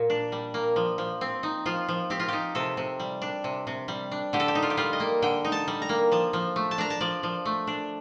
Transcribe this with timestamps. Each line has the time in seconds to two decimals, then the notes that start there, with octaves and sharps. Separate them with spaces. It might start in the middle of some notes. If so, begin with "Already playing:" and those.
Already playing: A#2 A#3
0.10 D4
0.32 G3
0.54 A#3
0.76 F3
0.98 F3
1.21 C4
1.43 D#4
1.65 F3 F4
1.88 F3
2.10 C4 G4
2.20 F4
2.28 D#4 G4
2.55 C3 A4
2.77 C3
3.00 G3
3.22 D4
3.44 C3
3.67 C3
3.88 G3
4.11 D4
4.33 D3 G4
4.40 A4
4.48 G4
4.55 D#4
4.62 F4
4.70 G4
4.77 G3 F4
4.93 D#5
5.00 A#3
5.22 D3 G5
5.44 D#4
5.52 A5
5.68 G3
5.82 A#5
5.89 A#3
6.12 F3 A5
6.33 F3
6.56 A3
6.71 A5
6.78 D4 A#5
6.90 A5
7.01 F3 D5
7.23 F3
7.45 A3
7.67 D4